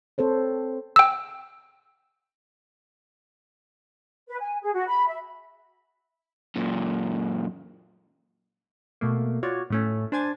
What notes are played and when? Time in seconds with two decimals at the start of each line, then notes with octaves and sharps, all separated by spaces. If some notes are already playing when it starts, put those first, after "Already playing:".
0.18 C4 A4 C5 C#5
0.96 G5 E6
4.28 B4
4.40 G#5
4.61 G#4
4.73 F#4
4.87 B5
5.06 E5
6.56 F#2 A#2
9.01 B2 A3 A#3
9.43 F4 F#4 C#5 D5
9.70 A2 A3 C#4
10.12 D4 C5 G#5 G#6 A6